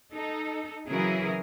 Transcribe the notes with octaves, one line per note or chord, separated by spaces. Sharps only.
D#4 A4
C#3 E3 F#3 E4 G#4 A#4